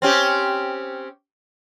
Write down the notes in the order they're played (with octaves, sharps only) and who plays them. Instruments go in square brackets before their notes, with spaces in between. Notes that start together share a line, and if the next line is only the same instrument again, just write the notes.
[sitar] C4 C#4 G4